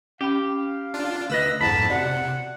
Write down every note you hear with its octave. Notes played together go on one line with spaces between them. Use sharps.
C#4 G4 F5 B5
D4 F4
D2 B4 D#5 E6 A#6
F2 G#2 E4 F#5 A5 B5
C3 F#4 D5 F#5